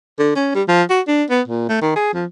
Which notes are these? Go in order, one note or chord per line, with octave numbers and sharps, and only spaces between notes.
D3
C#4
G3
F3
F#4
D4
B3
A#2
A3
D#3
G#4
F3